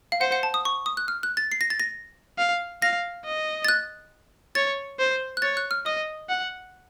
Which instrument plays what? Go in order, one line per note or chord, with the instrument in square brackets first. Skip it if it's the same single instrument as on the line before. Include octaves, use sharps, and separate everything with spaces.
[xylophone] F5
[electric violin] C5 [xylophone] F#5
[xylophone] F#5
A5
D#6
C#6
D#6
F#6
F6
F#6
A6
C7
A#6
A6
A#6
[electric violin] F5
[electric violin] F5 [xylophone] A#6
[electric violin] D#5
[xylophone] A6
F#6
[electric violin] C#5 [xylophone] A6
[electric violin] C5
[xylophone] F#6
[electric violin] C#5 [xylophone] A6
[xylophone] F#6
F6
[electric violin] D#5 [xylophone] D#6
[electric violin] F#5